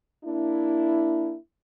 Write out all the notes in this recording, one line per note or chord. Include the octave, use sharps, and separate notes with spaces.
A#3 D4 E4